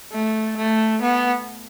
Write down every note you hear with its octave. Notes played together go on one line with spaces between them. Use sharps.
A3
A3
B3